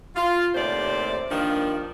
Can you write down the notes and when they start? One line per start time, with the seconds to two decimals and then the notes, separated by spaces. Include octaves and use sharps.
0.16 F4
0.55 D#2 A2 C3 C5 D5
1.31 G2 D#3 F3 A#3 D4